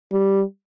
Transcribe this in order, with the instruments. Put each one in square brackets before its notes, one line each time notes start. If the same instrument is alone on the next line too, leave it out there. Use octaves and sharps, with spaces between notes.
[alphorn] G3